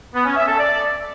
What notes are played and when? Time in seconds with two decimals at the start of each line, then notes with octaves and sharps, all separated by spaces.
0.14 B3
0.25 C#4
0.37 E5
0.48 A4
0.59 D5